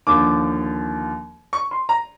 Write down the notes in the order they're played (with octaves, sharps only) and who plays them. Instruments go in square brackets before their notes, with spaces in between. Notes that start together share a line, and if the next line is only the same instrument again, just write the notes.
[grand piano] D#2 D3 F3 D6
C#6
C6
A#5